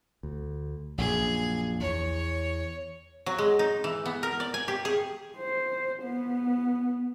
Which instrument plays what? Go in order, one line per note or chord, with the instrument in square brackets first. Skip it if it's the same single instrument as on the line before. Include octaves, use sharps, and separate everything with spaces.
[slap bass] D2
[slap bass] A#1 F#2 [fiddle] G#4
[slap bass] E2 [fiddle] C#5
[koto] F#3
G#3
D#4
E3
B3
A#4
D5
G#5
G4
G#4
[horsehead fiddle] C5
B3